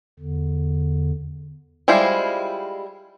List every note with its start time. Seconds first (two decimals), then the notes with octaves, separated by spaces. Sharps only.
0.19 E2 D3
1.88 G3 G#3 E4 F4 C5